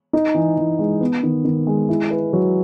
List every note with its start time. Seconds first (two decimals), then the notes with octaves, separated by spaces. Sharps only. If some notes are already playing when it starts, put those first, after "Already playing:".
0.13 D#4
0.34 E3
0.57 E3
0.79 G#3
1.01 B3
1.23 D#3
1.45 D#3
1.67 G#3
1.89 E4
2.11 B4
2.33 F#3